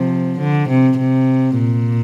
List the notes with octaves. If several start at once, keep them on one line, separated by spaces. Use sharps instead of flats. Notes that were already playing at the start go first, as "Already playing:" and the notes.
Already playing: C3 F3
D3
C3
C3
A#2